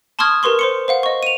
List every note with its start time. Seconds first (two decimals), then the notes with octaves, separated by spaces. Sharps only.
0.19 A5 C6 C#6 D#6 F6 G#6
0.43 G4 A#4 B4 C6 C#6
0.59 C5 C6 C#7
0.88 C5 F5 F#5
1.03 D#5 C#6
1.23 D#7 F7